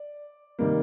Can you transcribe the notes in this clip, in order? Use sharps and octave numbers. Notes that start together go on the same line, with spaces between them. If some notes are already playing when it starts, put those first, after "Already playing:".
Already playing: D5
C3 D#3 G3 A#3